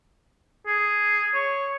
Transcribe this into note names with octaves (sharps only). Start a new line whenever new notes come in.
G#4
C#5